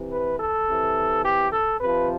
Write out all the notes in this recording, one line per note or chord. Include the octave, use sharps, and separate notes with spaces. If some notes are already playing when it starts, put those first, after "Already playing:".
Already playing: C3 E3
B4
A4
C3 E3
G4
A4
C3 F3 B4